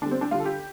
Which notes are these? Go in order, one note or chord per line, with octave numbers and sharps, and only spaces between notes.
D3 G3 D4
C4
D4
D3 G3 F4
A4
G4